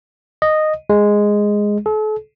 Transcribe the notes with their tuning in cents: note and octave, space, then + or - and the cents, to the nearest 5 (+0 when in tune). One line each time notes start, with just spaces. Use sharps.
D#5 -10
G#3 -5
A4 -40